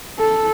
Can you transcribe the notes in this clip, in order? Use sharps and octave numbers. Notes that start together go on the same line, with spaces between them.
A4